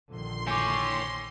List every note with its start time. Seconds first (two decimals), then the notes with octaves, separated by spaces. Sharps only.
0.11 A#1 D3 D#3 C6
0.47 C#5 G5 G#5 D6